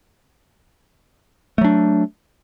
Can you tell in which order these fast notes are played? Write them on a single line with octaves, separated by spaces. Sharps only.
A3 F#3 D4